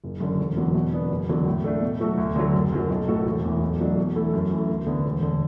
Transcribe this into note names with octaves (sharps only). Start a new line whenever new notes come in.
F#1
F#2 D3
E1
E2 D3 F#3
B2
B3 D4
F#1
E2 D3 F#3
A2
A3 D4 A4
B2
F#3 A3 F#4 A4
D2
D3 F#3
F#1
F#2 F#3
B1
A2 A3 F#4 A4
E1
E2 E3
B1
B2 F#3 A3 D4
E2
E3 A3 E4 A4
F#2
E3 A3
D2
D3 B3
E1
D3